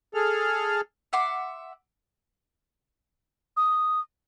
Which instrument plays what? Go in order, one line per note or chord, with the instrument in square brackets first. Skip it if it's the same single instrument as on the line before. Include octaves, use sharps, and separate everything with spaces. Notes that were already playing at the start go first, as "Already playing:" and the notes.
[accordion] G#4 A4 F6
[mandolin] E5 F#5 C6 D6
[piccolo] D#6